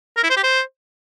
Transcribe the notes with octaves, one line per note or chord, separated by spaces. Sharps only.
A#4
E4
C5
G4
C5